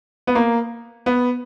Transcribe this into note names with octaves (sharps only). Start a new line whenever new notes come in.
B3
A#3
B3